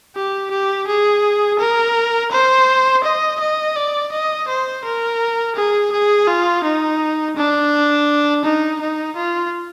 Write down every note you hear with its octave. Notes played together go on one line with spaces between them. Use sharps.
G4
G4
G#4
A#4
C5
D#5
D#5
D5
D#5
C5
A#4
G#4
G#4
F4
D#4
D4
D#4
D#4
F4